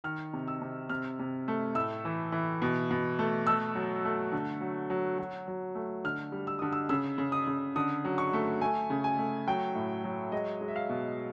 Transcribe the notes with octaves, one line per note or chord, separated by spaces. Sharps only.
D#3 F6
C3
E6
C3
C3 F6
C3
A3
A2 E6
E3
E3
B2
B2
A3
A3 E6
F#3
A3
D3
F#3
F#3
F#3
F#3
A3
D3 F6
G3
E6
D3 D#6
E6
C#3 E6
C#3
D#6
C#3
D3 D#6
F#3
C#6
A3
A3 G#5
C#3
G#5
A3
F#3 G5
A2
F#3
G#3 D#5
G#3
E5
F5
B2